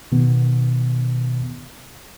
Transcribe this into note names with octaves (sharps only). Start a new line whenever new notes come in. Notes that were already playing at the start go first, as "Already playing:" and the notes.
B2 D#3 B3